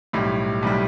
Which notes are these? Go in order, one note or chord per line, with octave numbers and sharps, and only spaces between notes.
B1 A2 G3
B1 A2 G3